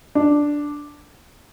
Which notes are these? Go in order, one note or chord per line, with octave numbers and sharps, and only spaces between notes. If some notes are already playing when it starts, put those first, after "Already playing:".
D4